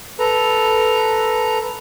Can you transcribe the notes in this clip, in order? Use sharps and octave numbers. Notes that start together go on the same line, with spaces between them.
A4 B4 A#5